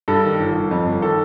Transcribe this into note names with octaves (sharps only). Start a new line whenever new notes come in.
G2 A4
D#3
G1
G1
F2
G1
D#3 A4